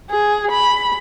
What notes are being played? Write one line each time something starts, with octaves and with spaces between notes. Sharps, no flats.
G#4
B5